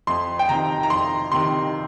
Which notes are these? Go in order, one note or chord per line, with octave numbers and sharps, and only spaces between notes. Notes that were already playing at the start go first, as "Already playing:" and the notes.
F2 C6
G5
C3 D#3 A#5
A#5
F2 C6
C3 D#3 C6